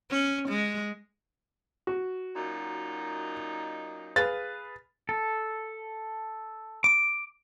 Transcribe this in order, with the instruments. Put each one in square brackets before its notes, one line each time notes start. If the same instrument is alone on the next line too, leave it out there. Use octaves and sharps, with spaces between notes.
[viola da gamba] C#4
G#3
[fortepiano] F#4
[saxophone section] F#2 A#2 D#4
[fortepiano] G#4 B4 F5 [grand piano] A6
[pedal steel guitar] A4
D6